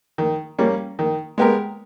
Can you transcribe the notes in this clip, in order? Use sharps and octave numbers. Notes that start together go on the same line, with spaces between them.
D#3
G3 A#3 C#4
D#3
G#3 B3 G4 A#4